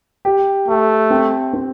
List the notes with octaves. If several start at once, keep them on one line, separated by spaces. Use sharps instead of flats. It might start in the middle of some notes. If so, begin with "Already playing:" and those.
G4
A3 G4
C4
C4